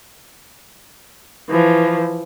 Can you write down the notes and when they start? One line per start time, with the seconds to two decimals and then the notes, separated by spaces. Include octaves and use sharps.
1.49 E3 F3